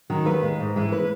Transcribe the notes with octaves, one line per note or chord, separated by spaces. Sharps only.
D#3 F#3
D#2 B4
D#3 G#3
G#2
E3 G#3
B4